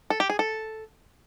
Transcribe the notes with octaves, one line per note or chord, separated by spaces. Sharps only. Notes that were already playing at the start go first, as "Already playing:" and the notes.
A4
G4
G#4
A4